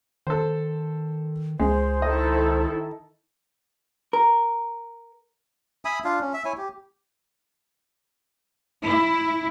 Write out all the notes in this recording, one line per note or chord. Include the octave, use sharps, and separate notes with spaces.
D#3 A4 C5
C#2 G#3 C5
D#3 E4 A4 D#5
A#4
E5 G#5 B5 D#6
D4 F4 F5
C#4
E5
E4 C#5 G#5
G4
E4